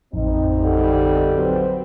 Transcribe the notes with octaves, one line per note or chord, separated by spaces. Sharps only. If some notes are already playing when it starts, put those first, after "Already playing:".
A1 F2 C4 D#4
D3 G3
F#3 C4 B4